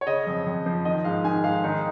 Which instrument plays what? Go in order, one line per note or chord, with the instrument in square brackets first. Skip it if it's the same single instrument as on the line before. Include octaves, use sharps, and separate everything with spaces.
[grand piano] C#5
C#3 D#5
F2
F2
F3
D#3 D#5
G#2 F5
D#3 G#5
G#2 F5
D#3 D#4